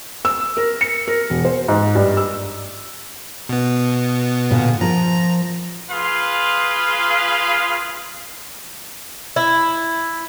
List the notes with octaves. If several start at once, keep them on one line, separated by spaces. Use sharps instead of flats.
E6
A#4
C#7
A#4
E1
C5
G#2
G2
E6
B2 B3
A#2 D3
F3 A#4 A#5
F4 G#4 B4 F5 C6
E4